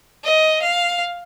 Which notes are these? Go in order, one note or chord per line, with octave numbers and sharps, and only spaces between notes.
D#5
F5